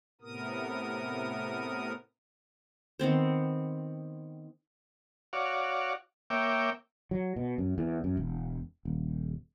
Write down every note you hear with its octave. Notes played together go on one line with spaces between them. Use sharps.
A2 C3 B3 A#4 D#6
D#3 B3 C4 C5
F#4 C#5 D5 F5
A#3 C#5 E5 G5 D6
F#3
B2
F#2
E2
F#2
E1
D#1